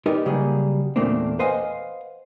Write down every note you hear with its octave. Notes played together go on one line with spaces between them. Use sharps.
D#4 G4 A#4 B4 D5
C#3 F#3 G3 A#3 G#4
E2 A#2 A3 A#3 C4 D4
B4 C5 D#5 F5 F#5 G#5